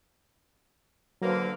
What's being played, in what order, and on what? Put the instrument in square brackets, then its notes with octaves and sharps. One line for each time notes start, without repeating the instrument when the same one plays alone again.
[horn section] D3 A#3 [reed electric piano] F#3 B4 C5